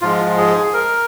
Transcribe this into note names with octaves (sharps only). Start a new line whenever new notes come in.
G#2 F3 G#3 F4
G#4
A#4